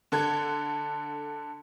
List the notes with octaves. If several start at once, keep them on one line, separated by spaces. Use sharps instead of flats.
D3 A4 G#6